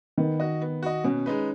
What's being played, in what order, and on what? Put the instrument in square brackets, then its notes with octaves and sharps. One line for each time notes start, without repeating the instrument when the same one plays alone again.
[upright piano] D#3 [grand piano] B3
[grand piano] F#4 D#5
B3
F#4 D#5
[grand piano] B2 [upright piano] C#4
[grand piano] G#3 D#4 B4